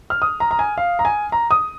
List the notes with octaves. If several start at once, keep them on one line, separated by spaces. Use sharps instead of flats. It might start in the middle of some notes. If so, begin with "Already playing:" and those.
F6
D#6
A#5
A#5
G#5
F5
A#5
G#5
A#5
D#6